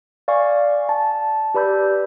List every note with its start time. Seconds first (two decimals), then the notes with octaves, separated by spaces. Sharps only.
0.28 D5 F5 G#5 C#6
0.89 A5
1.54 G4 B4 D5 B5 E6 G6